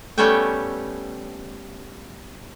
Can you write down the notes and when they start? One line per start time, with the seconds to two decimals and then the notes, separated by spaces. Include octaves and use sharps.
0.18 G3 A3 B3 C#4 E5 G5